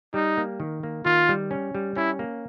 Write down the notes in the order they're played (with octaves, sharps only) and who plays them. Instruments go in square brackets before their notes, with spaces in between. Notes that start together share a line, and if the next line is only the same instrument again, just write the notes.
[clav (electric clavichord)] G3 [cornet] D#4
[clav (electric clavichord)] A#3
D#3
A#3
[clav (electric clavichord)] D#3 [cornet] F4
[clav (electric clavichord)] G3
C#4
G3
[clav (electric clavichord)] C#4 [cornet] E4
[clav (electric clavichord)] A#3